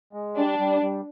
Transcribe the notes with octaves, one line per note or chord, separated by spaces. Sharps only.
G#3
G3 D4
G3
G3